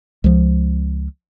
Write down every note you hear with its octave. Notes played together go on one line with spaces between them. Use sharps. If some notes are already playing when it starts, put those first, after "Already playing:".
C#2 F3